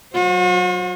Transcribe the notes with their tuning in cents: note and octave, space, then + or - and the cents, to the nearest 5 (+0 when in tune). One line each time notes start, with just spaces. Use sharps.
F#3 +0 F#4 -45 C5 +20